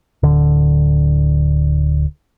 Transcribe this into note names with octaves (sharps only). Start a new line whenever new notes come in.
D1 D3